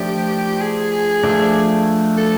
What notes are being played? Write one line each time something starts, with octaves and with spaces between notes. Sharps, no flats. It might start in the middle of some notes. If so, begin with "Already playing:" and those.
Already playing: F3 A3 D4 G4
G#4
F3 A3 D4
A4